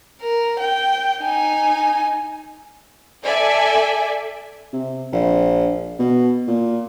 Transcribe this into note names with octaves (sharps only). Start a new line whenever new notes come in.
A#4
G5
D#4 G#5
A4 D5 E5 G#5
C3
A#1
B2
A#2